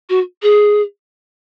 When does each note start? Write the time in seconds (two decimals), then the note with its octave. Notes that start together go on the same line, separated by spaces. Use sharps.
0.10 F#4
0.42 G#4